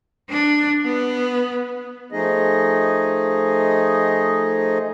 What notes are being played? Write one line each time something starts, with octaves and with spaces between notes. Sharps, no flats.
D4
B3
F3 A3 D#4 G#4 D#5